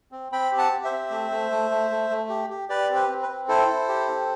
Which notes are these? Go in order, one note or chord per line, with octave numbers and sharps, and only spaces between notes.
C4
C4 G5 B5
G4
F#5 A5
G4
C5 E5
C4
A3
A3
A3
A3
A3
A3
G4
G4
G4 B4 D5
C4
B4
C4
B4
C4
E4 A4 C5
E4
G4
C4